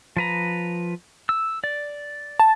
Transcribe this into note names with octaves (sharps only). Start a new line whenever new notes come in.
F3 B4 A#5
E6
D5
A5